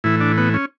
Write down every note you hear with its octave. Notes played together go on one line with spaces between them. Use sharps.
A2 E3 E4
D4
B3
C#4